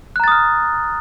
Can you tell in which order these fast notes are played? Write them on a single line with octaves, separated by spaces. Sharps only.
F#6 A#5 A6 D#6 F6